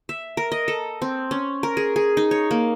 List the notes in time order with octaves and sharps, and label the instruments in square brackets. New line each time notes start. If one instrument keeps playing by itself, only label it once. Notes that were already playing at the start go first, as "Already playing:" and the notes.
[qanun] E5
A#4
D#5
A4
C4
C#4
A#4
G#4
G#4
D#4
C#5
A#3